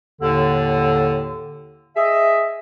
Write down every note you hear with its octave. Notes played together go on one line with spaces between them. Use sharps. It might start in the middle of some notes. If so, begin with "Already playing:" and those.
D#2 A2 D3
G#4 D#5 E5